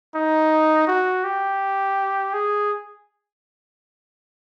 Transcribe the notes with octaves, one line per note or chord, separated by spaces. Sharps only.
D#4
F#4
G4
G#4